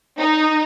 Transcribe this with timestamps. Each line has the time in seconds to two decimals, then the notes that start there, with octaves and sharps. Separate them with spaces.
0.19 D#4